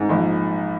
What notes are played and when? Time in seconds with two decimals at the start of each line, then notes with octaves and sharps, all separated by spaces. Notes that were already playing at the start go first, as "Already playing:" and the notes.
Already playing: G#2
0.09 A#1